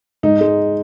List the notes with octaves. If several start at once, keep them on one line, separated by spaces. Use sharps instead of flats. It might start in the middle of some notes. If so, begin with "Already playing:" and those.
G#2 D#4
G#3